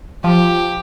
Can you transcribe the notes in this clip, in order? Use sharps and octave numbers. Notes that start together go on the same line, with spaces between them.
F3 G4